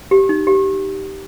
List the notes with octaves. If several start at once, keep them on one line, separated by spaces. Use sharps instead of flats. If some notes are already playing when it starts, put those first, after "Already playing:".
G4
D#4
G4